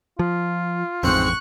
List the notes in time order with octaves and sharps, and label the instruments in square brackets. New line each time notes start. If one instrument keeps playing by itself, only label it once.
[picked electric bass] F3 [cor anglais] F4
[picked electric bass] A1 F2 [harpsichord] G#2 C4 [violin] C#6 F#6